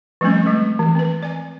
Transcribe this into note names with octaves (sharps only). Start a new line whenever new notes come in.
F3 G3 A3 C4 C#4
G#3 A3
E3
C4 B4
D5 G#5